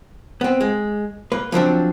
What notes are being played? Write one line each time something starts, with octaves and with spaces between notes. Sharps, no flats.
B3 C4
G#3
A#3 B4
F3 F#3 C4 D4